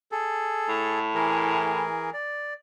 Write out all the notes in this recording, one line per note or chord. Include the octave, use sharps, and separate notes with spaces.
G#4 A4
A2
E3 G#4 A#4
D5